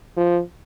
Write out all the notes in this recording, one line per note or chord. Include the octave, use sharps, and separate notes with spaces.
F3